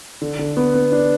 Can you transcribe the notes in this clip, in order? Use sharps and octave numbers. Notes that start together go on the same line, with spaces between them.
D3
D3
B3
B3
D4